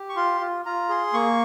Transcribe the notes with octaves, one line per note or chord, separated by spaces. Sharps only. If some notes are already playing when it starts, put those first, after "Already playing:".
Already playing: G4
C#6
F4 C6
F4
F4 A#5
G#4 C6
A#3 C#6